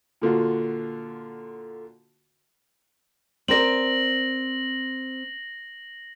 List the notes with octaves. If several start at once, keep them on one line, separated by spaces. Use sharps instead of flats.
A#2 D3 F4 F#4
C4 A#4 D5 A#6 F#7